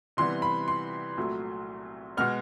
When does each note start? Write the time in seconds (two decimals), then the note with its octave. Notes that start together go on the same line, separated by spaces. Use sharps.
0.17 C3 E3 G3 B3 C6
0.42 B5
0.68 C6
1.17 C2 A#2 F#3 A3
2.17 B2 G#3 B3 F6